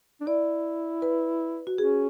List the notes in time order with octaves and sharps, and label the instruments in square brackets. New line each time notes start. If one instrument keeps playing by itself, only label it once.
[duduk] D4
[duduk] E4 [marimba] D5
[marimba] B4
F#4
[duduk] C#4 [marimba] G#4